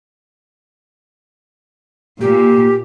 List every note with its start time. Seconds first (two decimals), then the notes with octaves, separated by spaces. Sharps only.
2.21 A#2 G4